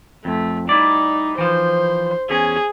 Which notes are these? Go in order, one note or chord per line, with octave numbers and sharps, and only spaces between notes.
F2 A3
G3 D#4 E4 D5
E3 F3 C5
E2 C#4 G#4